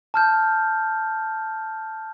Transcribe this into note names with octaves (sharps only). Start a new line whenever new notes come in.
A5 F6 G6